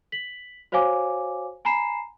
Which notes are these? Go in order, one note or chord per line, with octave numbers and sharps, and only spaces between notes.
B6 F#7
F#4 C5 C#5 F5 G#5 D6
G#5 A#5 B5 C7 E7